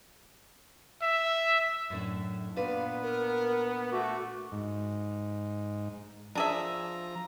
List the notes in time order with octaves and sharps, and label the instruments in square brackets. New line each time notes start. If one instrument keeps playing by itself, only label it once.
[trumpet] E5
[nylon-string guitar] F#2 A2 D4
[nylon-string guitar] A#2 D4 B4 [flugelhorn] B3 [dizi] F5
[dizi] A#4
[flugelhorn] A3 [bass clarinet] F#4 [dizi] D6
[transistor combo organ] G#2
[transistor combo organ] F3 A#5 [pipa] D4 G#4 E5